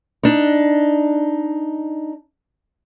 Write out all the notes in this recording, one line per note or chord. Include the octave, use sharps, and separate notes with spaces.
D4 D#4